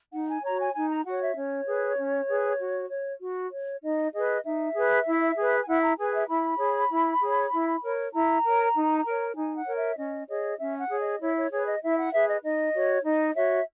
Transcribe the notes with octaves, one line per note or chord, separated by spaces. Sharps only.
D#4 F#5
G#5
F#4 C#5 A#5
G#5
D#4 G#5
A#5
F#4 C#5 F#5
E5
C#4 C#5
G#4 B4
C#4
G#4 B4
F#4
C#5
F#4
C#5
D#4 D#5
G#4 B4 D#5
D#4 E5
G#4 B4
E4
G#4 B4
G#5
E4 F#5
A#5
G#4 B4 G#5
E5
E4 B5
G#4 C#5
E4
G#4 C#5
E4
A#4 C#5
E4 A#5
A#4 C#5
D#4
A#4 C#5
D#4 G#5
F#5
A#4 C#5
E5
C#4 D#5
G#4 C#5 D#5
C#4 E5
F#5
G#4 C#5
D#5
E4 C#5
C#5
G#4 B4 C#5
D#5
E4 E5
F#5
G#4 B4 E5
D#5
D#4 D#5
F#4 C#5
D#4 D#5
F#4 C#5 E5